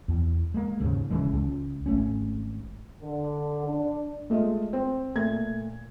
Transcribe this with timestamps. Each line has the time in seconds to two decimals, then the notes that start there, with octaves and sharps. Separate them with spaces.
0.08 E2
0.54 G#3 A#3
0.80 D#2 G#2 C#3
1.10 D#1 C#3 E3 G#3
1.33 C#2
1.86 G#1 A3 C#4
3.02 D3
3.66 D4
4.30 G#3 A3 F4 D#5
4.73 C4
5.15 A#2 A3 G#6